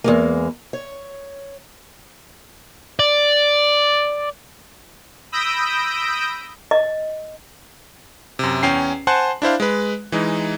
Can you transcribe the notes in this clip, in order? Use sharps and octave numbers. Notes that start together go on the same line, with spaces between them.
E2 G#3 A#3
C#5
D5
B5 D#6 E6 G6 A#6 D7
D#5
F#2 C3
E2 C#4 G5 C7
C5 F#5 G#5 A5 C6 F#6
D4 E4 C5 F5
G#3 B4
E3 G#3 D#4